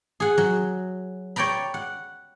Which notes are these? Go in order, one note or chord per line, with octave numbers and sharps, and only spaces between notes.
G#4 F#5
F#3
C#5 D5 G5 A#5 B5
F#5